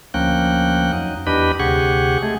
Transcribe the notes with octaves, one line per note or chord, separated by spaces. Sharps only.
D2 F3 A#3 C#4 G5 F#6
F2 F#3 D#4
E2 D4 G4 B4 D#5 B5
D2 C3 G4 G#4 F#5 C#6
G#3 A3 G#4